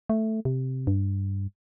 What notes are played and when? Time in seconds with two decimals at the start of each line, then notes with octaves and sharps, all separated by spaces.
0.10 A3
0.45 C3
0.87 G2